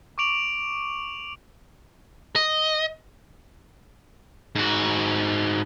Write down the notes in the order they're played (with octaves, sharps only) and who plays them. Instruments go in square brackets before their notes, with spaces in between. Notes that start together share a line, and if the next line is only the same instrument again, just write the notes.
[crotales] C#6 D6 D7 F7 F#7
[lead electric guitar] D#5
[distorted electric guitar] G#2 F#4